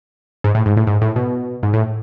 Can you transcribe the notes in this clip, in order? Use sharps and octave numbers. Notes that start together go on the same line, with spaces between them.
G#2
A2
G#2
A2
G#2
A2
B2
G#2
A2